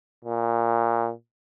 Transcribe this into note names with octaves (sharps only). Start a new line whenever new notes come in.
A#2